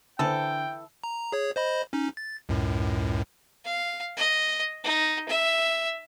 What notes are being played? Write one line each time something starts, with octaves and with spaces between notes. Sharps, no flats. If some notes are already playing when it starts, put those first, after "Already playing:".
D3 E3 A4 C5 G5
A#5
G#4 C#5
C5 D#5 B5
C#4 D#4
A6
C#2 F#2 A2
F5
D#5
D#4
E5